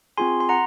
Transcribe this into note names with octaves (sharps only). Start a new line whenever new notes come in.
C4 F4 G#4 G#5 C6
C6
F#5 A#5